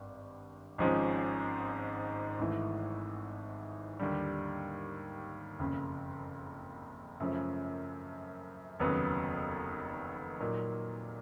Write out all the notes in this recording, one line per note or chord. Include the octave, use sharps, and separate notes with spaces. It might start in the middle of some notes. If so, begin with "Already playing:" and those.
Already playing: G#1 G2
G#1 G#2 F3 G#3 C#4
G#1 G#2 E3 A3
D#2 D3 G3
F#1 F2 C#3
F#2 C#3 F3 A3 C#4
F1 D#2 C#3 F#3 B3
A#2 F#3 A#3 D#4